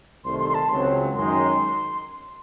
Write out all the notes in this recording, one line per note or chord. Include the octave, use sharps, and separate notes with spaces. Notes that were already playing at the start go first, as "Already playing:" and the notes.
C2 C3 D#3 A3 C6
C6
C6
A5
C#2 C#3 F#3 C4 C6
F#2 D#3 G#3 D#4 C6